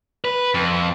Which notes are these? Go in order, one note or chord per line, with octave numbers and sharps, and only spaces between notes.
B4
F2